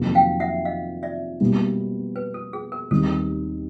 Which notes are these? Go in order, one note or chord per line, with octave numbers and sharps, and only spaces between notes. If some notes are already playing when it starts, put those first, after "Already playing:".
Already playing: F2 C3 D#3 F#3 A#3
F5 G5
E5 F#5
D#5 F5
D5 E5
B2 G3 A#3
B4
A4
G#4
A#4
D#2 D#3 G3 C4 A4
A#4